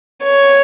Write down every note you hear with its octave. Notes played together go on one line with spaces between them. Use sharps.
C#5